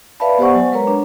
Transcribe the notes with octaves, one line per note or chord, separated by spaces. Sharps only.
B4 D5 E5 F5 A5 B5
B3 G4 C5 D5 F#5 C#6
F#3 G#5
G#3 A#4 B4 C#5 A#5
D4